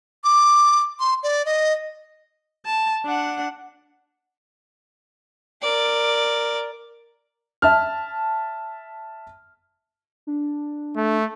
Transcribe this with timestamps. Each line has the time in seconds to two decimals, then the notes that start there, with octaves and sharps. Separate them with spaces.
0.24 D6
1.00 C6
1.23 D5
1.46 D#5
2.65 A5
3.05 D4 F#5
5.62 A#4 D5
7.62 E5 A5 F6
10.27 D4
10.96 A3